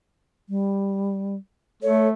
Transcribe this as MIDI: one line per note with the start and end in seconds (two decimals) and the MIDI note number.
0.49 1.36 55
1.82 2.14 57
1.82 2.08 69
1.82 2.08 73